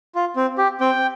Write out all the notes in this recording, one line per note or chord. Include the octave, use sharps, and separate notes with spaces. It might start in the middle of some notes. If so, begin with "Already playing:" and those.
F4
C4
G4
C4 G5